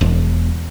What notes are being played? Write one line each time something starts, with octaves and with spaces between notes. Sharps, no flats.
E1